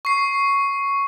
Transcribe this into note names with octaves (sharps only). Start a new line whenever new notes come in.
C#6 C7